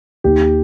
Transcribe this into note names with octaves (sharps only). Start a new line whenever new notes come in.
D#2 G4